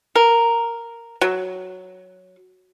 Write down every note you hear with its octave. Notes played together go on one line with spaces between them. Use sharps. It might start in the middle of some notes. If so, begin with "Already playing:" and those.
A#4
F#3